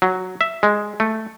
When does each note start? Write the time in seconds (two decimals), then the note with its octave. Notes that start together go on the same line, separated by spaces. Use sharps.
0.02 F#3
0.41 E5
0.63 G#3
1.00 A3